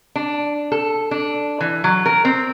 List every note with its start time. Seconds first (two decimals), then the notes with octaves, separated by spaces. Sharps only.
0.15 D4
0.72 A4
1.11 D4
1.60 E3
1.84 F#3
2.06 A#4
2.25 C4